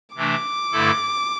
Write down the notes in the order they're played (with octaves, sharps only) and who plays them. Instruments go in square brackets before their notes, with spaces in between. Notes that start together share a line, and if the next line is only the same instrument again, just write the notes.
[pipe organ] C3 E3 A3 D4 [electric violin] D6
[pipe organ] G2 D3 A3 E4 A4